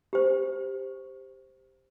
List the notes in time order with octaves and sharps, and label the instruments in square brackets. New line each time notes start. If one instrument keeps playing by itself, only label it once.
[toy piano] G4 C5